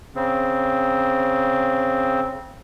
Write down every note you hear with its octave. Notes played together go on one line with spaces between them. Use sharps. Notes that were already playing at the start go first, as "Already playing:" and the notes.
C#3 C4